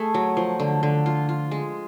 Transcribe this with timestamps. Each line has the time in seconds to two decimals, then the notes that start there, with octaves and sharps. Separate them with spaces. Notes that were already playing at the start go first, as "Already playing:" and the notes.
Already playing: A3 G#4
0.14 F#3
0.37 F3
0.60 D3
0.83 D3
1.06 F4
1.29 F4
1.51 G#3